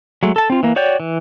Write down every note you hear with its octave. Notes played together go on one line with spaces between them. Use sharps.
F#3 G#3 A3
A4 A5
C4 F4
E3 A#3
F#4 C#5 D5 G5 G6
E3